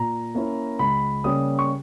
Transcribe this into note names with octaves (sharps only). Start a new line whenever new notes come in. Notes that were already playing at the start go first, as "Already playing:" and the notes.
Already playing: A#2 A#5
A#3 C#4 E4
C#2 B5
C#3 G3 A#3 C#4 D#6
C#6